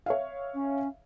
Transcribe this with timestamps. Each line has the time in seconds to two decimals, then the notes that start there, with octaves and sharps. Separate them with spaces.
0.06 C#5 E5 F5
0.54 C#4